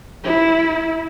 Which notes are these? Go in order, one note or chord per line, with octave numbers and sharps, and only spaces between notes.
E4